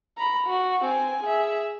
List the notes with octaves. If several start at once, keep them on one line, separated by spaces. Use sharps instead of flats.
A#5 B5
F#4
C4 G#5
G#4 E5